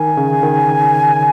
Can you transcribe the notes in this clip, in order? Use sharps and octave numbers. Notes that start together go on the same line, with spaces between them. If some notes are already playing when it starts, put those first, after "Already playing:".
Already playing: D#3 G#5
C#3
D#3